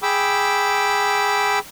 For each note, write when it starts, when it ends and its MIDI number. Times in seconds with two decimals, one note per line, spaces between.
0.03 1.59 68
0.03 1.59 79
0.03 1.59 83
0.03 1.59 86
0.03 1.59 88